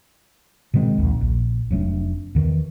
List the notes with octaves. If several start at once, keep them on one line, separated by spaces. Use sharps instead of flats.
B2 D#3 G#3 C4
A#1 D#2
A#1
F1 F#3 A3 D4
E2 D#3 E3